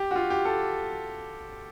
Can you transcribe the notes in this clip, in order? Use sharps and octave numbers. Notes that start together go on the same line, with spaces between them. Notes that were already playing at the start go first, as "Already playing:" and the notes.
Already playing: G4
F#4
F4
G4
A4